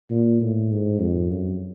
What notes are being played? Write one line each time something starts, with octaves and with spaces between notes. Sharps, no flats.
A#2
A2
G#2
F2
F#2